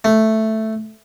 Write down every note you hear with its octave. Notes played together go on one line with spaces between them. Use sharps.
A3